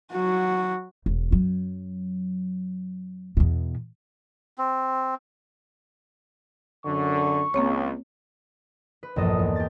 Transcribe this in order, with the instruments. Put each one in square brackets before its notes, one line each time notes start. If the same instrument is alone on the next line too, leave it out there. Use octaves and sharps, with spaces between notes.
[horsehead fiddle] F#3 F#4
[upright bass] E1
F#2 F#3
E2 B2
[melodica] C4
[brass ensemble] F#2 D3 [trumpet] C#6
[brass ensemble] C#2 [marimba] A#3 C4 C#5
[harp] B4
A#1 E2 G2 A#3 A4 D#5
E2
G4 A6